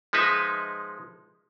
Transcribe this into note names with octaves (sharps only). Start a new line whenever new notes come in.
F3 G#3 D#4 B4 E5